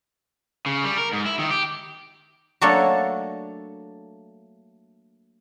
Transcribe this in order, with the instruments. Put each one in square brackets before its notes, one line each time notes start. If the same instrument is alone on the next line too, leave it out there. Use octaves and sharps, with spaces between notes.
[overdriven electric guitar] C#3
G3
A#4
G#2
E4
D#3
G4
[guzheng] F#3 A3 A#3 D4 A4 C#5